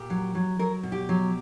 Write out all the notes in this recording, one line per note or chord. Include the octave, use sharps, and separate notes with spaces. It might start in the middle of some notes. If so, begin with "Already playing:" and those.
Already playing: A#2 G4
F#3
F#3
F#3 A#4
B2
G4
F#3